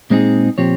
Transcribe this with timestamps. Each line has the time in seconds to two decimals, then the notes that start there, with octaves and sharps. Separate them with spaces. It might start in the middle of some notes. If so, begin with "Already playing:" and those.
0.10 A#2 G#3 C4 D#4 G#4
0.58 A#2 F3 C4 G4 C#5